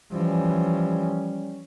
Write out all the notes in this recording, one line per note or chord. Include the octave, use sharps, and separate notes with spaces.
E3 F3 G3 C#4